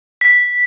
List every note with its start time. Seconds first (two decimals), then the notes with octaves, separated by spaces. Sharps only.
0.21 B6